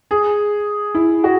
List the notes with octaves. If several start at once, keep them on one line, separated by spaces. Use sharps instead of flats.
G#4
E4
F#4